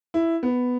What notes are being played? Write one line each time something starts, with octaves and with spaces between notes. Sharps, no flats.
E4
B3